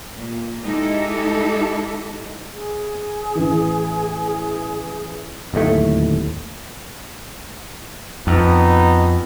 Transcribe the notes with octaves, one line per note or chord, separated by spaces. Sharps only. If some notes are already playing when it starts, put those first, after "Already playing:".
A#2
G#3 D#4 E4 G4 A4
G#4
A1 E3
D1 D#2 A2 A3
F2 B3 D#4